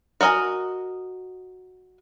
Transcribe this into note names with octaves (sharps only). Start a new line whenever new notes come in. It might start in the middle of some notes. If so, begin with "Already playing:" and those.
F#4 A#4 D#5 G#5